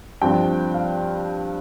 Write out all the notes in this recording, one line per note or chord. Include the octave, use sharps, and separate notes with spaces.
G2 F3 C4 G5
F5